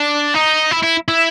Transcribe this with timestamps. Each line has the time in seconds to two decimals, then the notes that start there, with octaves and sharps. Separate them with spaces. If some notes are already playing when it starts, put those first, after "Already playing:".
Already playing: D4
0.35 D#4
0.71 E4
0.83 E4
1.08 E4